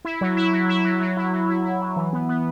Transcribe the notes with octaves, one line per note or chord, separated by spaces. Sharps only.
E4
F#3
E4
F#3
E4
F#3
F#3
E4
F#3
E4
E4
F#3
E3
B3
B3